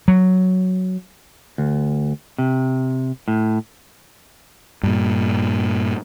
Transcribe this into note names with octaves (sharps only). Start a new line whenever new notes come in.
F#3
D2
C3
A2
G2 A#2